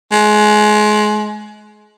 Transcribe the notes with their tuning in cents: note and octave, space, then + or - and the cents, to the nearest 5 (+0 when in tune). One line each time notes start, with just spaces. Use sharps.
G#3 +25